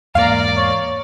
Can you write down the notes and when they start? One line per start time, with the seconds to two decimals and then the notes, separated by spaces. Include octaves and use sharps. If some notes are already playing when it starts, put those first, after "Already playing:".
0.15 E2 G#2 A#3 D5 F5 A#5
0.57 C#5